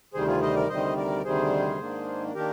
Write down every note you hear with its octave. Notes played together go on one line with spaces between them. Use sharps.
D2 C3 D#3 G3 G#4 C5
F4 G#4
C5 D#5
A#4 D5
D2 C3 D#3 G3 C5 D#5
A#4 D5
D2 C3 D#3 G3 G#4 C5
G#2 D#3 A#3 D4
D#3 A#3 D4 G4 A#4